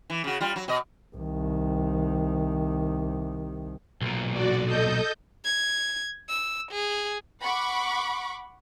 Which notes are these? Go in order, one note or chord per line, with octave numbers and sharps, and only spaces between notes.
E3
C#3 F#4
G3 F4
F#3
B2 D#5
C2 D#3
B1 A#2
F#4 D5
A4 D#5 G6
G#6
E6
G#4
F#5 B5 C#6 D6